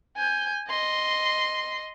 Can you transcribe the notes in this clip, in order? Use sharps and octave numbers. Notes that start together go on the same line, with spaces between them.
G#5 G6
D#5 C6